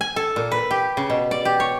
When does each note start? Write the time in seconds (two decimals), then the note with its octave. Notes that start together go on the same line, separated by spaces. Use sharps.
0.01 G#5
0.16 A4
0.36 A#2
0.52 B4
0.71 G4
0.97 C#3
1.10 B2
1.31 D5
1.45 G4
1.60 C#5